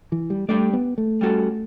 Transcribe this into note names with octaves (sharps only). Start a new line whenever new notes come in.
E3
G3
G3 A3 D4 G4 D5
B3
A3
G3 C#4 F#4 A4